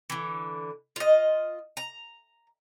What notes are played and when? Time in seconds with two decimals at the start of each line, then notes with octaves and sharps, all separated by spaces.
0.10 D3 E3
0.96 F4 D#5
1.77 A#5